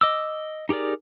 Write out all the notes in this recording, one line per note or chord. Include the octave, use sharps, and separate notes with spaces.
D#5 D6 E6
D#4 G4 G#4 A#4 D5